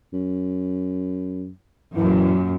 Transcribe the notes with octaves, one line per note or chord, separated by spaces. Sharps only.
F#2
F#2 A#2 E3